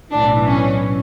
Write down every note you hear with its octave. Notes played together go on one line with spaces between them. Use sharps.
B1 A2 E3 D4
C#4